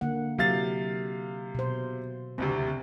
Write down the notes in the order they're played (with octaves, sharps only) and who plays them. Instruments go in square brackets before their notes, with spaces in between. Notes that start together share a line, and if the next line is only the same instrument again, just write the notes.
[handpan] D3 A#3 F#5
[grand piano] C3 F5 A6 [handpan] F#3 E4
[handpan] B2 C5
[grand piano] F#1 D2 C3 [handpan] C4